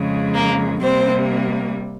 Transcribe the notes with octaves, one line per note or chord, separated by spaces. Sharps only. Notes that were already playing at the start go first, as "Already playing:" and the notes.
Already playing: F2 C#3 G#3
A#3 A#4
C3 G3 A#3 C4 C5